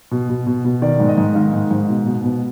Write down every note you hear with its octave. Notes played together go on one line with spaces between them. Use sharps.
B2
B2
B2
B2
D#3 D5
G#2
D#5
G#2
D#3 F5
G#2
G#2
B2
B2
B2